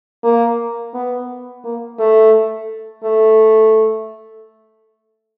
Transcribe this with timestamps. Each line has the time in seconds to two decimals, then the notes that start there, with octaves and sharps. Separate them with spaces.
0.24 A#3
0.94 B3
1.64 A#3
1.99 A3
3.04 A3